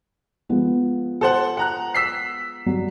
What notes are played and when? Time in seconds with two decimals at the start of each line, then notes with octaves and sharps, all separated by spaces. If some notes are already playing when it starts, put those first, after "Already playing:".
0.49 F3 G#3 B3
1.21 A4 C5 F#5
1.57 F#5 A#5 F#6
1.94 E6 B6 C7
2.66 F#3 G3